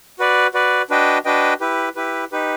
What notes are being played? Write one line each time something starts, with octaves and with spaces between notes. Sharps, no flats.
F#4 B4 D5
F#4 B4 D5
D4 F#4 B4 D#5 G5
D4 F#4 B4 D#5 G5
E4 G4 B4
E4 G4 B4
D#4 G4 B4